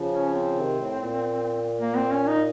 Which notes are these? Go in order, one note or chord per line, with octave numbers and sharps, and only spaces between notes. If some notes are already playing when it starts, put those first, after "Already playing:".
Already playing: C#3 F3
C#4
C4
C3 D#3
A2
A#2
A#3
C4
C#4
D#4